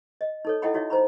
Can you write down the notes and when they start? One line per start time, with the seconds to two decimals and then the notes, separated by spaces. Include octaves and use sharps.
0.21 D#5
0.45 D#4 A4 C#5
0.62 E4 A4 D#5 F#5 G5 B5
0.74 D#4 F#4 C#5 E5
0.90 D#4 C5 A#5 B5